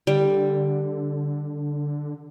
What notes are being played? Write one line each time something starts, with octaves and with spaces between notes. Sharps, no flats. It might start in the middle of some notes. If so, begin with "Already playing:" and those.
D3 G3